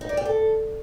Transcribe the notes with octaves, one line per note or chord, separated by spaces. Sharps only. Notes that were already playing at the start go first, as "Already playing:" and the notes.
D#4
D5
G4
A4